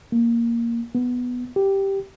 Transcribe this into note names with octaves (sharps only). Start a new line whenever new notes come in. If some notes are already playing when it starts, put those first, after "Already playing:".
A#3
B3
G4